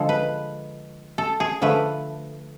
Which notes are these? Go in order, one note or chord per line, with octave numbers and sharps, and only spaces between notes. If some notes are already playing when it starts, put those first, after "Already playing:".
Already playing: D3 F3 G#3 A4
B4
A4
G#4
D3 F3 A3 B4